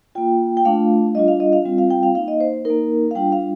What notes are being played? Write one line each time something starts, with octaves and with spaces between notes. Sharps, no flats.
A#3 F4 G5
G5
A3 D4 F4 F5
G3 D4 F4 D#5
F5
D#5
F5
G3 C4 F4
F5
G5
F5
A#3 D#4 F5
D#5
C5
A#3 D#4 A#4
F5
G3 D4 F4 G5
F5